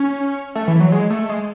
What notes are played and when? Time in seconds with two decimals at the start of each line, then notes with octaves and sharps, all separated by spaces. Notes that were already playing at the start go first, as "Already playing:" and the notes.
Already playing: C#4
0.55 A3
0.68 E3
0.80 F#3
0.92 G#3
1.10 A3
1.29 G#3